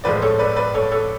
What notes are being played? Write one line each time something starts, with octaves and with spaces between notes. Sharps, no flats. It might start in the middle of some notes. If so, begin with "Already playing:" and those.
A2 F3 G#3 B4 D5
A4 C#5
B4 D5
B4 D5
A4 C#5
A4 C#5